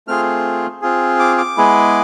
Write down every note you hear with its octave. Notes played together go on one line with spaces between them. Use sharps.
A3 C4 F4 G#4 F6
C4 F4 G#4
D6
D6
G#3 B3 E4 G#4